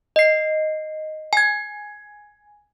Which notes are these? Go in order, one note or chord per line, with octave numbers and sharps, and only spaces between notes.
D#5 C7
G#5 G#6